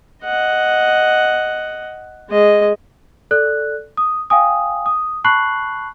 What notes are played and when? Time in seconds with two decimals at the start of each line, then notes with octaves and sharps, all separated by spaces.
0.24 D#5 F#5
2.30 G#3 D#5
3.31 A4 D5 F#6
3.97 D#6
4.30 F5 G5 G#5 D#6
4.86 D#6
5.24 A5 B5 C#6 F#6 C7 F#7